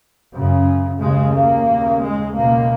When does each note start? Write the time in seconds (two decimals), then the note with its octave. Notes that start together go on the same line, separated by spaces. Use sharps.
0.34 F#2 C#3
1.00 D#2 C#3 G#3
1.33 A#3
1.67 D#2 C#3
2.01 G#3
2.34 C#2 B2 A#3